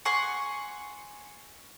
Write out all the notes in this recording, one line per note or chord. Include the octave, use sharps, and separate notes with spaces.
F#5 G#5 C6 C#6